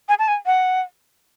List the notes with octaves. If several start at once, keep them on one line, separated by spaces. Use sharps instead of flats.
G#5
A5
G#5
F#5